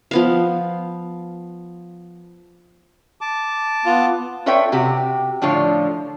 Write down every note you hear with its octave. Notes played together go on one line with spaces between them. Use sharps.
F3 B3 F5
A5 D6
B3 F4
F4 A4 B4 C#5 E5 G5
C3 F#4 G4
A2 D3 F3 F4 C#5